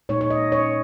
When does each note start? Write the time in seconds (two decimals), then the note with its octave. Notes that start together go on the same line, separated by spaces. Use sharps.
0.09 A#2 G#3 D#4 C#5
0.21 C#5
0.30 D#5
0.52 C#5